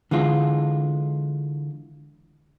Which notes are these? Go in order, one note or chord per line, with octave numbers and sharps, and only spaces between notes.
D3 E3 G#3 F4